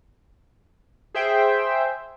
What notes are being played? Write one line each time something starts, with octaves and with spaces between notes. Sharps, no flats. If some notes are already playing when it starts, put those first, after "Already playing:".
G#4 C5 E5 G5